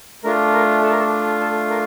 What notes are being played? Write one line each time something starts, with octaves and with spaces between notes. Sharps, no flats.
A3 D4 F4 A#4
A#4
A4
A#4
A4
A4
A#4